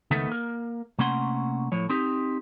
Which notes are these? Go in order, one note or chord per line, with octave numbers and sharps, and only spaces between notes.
C#2 D#3 A3 B3 E5
A#3 A#4
C3 A3 A#3 C#4 F#5 C6
A2 F3 C#5
C4 D#4 G4